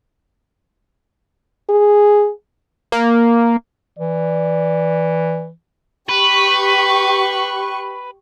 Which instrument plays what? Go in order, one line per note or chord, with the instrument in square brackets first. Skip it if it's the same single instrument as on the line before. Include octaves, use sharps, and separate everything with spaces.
[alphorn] G#4
[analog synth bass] A#3
[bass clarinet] E3 [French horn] D5
[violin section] G4 C#6 [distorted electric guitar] B4